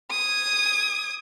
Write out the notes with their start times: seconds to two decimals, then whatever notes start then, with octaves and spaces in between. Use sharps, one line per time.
0.11 D#6 G#6